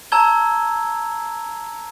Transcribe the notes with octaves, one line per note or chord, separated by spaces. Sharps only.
A5 A#5 E6 G#6 G7